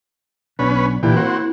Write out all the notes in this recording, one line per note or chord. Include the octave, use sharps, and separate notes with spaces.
B1 B2 C#4 D4 B4
A#2 D3 E3 E4 G4
A#3 C4 F#4